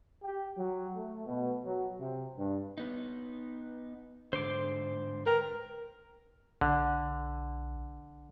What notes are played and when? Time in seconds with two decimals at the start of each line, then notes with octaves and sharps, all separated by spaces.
0.23 G4
0.58 F#3
0.95 A3
1.26 B2
1.65 F#3
1.99 C3
2.37 G2
2.78 B3 D#4
4.33 G#2 D3 C5 C6 D6
5.26 A#4 B4 G5
6.61 B1 D3